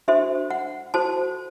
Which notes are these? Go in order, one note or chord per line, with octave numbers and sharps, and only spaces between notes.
D4 F#4 A4 C5 E5
F#5
F#4 A4 C5 A5